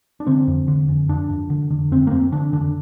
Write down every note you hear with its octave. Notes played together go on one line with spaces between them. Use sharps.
D4
D3 C4
F2
D3
F2
F2 D4
F2
D3
D3
F2 C4
A#3
F2 C4
D3 D4
D3 D4